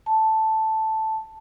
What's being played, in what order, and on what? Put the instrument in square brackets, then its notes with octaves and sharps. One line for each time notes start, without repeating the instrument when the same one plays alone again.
[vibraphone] A5